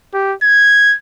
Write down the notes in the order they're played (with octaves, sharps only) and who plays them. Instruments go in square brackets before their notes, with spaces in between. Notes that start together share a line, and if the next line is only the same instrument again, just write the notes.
[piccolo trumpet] G4
G#6